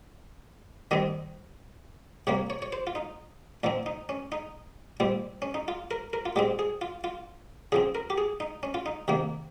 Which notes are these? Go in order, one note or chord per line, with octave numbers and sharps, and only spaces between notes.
D#3 G3 C4 D#5
C3 G3 A#3 C#5
C#5
C#5
C5
F4
D#4
A#2 F3 C4 D#4
D#4
C#4
D#4
A#2 G3 C4
C#4
D#4
F4
A#4
A#4
F4
A#2 G#3 C4 G4
G#4
F4
F4
C#3 F3 C4 G#4
A#4
G4
G#4
D#4
C#4
F4
D#4
C3 D#3 A#3